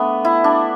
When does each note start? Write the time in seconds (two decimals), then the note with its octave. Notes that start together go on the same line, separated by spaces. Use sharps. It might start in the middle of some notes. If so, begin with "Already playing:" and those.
Already playing: A3 B3 D4
0.25 E4
0.44 D4